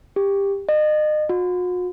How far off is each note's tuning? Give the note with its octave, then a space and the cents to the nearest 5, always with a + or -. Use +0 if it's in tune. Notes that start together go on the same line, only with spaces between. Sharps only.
G4 +20
D#5 -35
F#4 -45